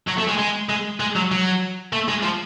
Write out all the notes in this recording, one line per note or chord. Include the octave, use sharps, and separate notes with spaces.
F#3
A3
G#3
G#3
G#3
G#3
F#3
F#3
A3
G#3
F3